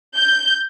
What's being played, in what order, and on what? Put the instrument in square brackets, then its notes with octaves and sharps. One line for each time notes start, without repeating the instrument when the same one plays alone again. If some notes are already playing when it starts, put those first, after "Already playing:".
[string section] G6